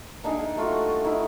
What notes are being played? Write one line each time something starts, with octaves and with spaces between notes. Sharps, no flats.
A#3 D4 D#4 G#4
G5
G3 A3 F4 F#4
D#3 E4